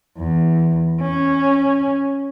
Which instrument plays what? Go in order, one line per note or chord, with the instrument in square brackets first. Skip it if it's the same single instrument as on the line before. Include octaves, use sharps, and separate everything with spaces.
[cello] E2
C#4